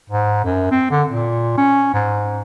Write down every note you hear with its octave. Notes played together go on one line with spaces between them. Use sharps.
G#2
F#2
C4
D3
A#2
C#4
G#2